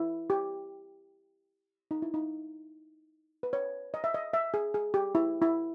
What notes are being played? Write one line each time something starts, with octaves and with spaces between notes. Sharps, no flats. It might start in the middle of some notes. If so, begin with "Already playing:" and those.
Already playing: E4
G4
D#4
E4
D#4
B4
C#5
D#5
E5
D#5
E5
G#4
G#4
G4
E4
E4